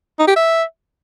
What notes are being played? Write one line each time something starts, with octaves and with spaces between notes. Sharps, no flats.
D#4
G4
E5